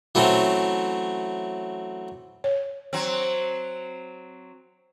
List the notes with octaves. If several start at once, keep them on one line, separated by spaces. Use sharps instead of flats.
E3 F#3 A3 C4 C#4
C#5
F#3 C4